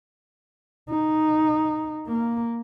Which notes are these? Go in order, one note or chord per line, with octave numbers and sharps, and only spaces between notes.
D#4
A#3